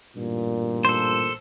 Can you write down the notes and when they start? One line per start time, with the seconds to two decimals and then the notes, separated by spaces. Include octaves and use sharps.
0.16 A1 G2 A#2
0.85 A4 C5